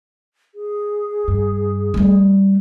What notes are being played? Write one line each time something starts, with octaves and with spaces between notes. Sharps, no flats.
G#4
G2
G3 A3